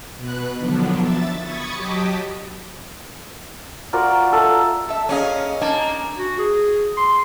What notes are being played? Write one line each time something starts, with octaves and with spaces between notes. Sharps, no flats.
B2 B4 F#6
D3 D#3 F3 F#3 B3 D4
E5 A6
B5 C#6 D#6 G#6 A6 C#7
F#3 G4 D#5 A5 D6 B6
F4 F#4 A#4 D5
A4 E5 F5
A4 E5
A#3 C#4 G#4 D#5 F5
A#3 D4 D#4 G#5
F#4
G#4
C6